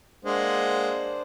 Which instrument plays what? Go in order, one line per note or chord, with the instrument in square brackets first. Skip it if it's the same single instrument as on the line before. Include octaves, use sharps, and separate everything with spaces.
[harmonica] G#3 A#3 F#5 [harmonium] D4 C5